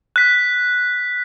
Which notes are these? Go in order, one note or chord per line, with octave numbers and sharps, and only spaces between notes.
F#6 B6